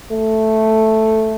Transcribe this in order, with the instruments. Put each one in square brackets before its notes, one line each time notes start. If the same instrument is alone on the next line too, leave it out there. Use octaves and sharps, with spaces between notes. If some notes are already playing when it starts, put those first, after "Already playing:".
[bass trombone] A3